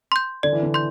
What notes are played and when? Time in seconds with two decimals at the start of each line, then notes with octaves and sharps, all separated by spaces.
0.12 C6 G6
0.43 D3 D5
0.53 E3
0.63 D3
0.74 C6 G6